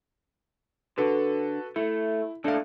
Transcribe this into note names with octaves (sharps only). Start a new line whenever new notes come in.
D3 F#4 A4 B4
A3 E4
A#2 A3 D4 F5